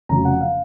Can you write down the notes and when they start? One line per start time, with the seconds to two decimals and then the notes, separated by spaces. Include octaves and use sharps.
0.09 F1 F2 C#3 F#3 A#5
0.25 F#5
0.41 F5